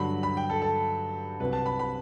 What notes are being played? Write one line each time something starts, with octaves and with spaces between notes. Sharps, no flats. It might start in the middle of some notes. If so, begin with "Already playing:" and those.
Already playing: G2 D3 F#3 B5
B5
G5
A4
A4
C2 C3 F#3 C4 B4
A5
B5
B5